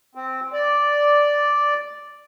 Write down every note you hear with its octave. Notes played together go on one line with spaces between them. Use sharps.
C4
D5